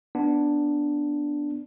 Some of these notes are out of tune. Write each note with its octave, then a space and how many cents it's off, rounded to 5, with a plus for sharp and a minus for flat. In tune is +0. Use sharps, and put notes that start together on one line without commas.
B3 +0 D4 +0